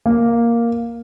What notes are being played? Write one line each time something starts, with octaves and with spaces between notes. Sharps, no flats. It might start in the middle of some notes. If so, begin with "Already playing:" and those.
A#3